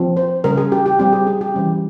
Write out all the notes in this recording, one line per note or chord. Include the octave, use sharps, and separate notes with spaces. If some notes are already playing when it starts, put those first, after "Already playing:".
Already playing: F3 C4
C5
C#3 G3 C#4 A#4
G#4
G4
G4
G3 C4 G4
G#4
G#4
G4
E3 G3 C#4